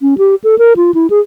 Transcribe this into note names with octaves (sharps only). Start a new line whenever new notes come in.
C#4
G4
A4
A#4
F4
E4
G#4